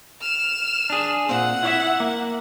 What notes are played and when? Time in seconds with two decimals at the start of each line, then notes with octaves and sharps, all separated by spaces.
0.21 F6 E7
0.90 D4 G#4
1.29 A#2 C4 F#5
1.63 E4 C#5 E5
2.00 A#3